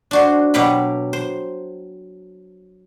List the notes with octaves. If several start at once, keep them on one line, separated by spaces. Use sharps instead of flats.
D4 F#4 C5
B2 F#3 G4 F5 B5
C5